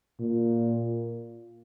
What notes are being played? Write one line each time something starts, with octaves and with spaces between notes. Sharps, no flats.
A#2